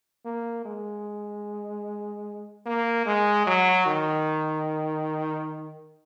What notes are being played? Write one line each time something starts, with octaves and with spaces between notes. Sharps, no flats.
A#3
G#3
A#3
G#3
F#3
D#3